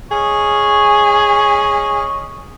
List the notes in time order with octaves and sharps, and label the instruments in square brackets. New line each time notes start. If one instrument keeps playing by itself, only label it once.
[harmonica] C#4 D#5 C#6 [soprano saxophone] G#4